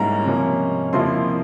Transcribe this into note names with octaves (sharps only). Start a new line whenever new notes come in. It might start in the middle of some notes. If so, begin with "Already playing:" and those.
Already playing: G#2 G3 A#3 C#4 E4 A#5
C3 F3 A#3 C#4
F2 C3 F3 A#3 E4 C6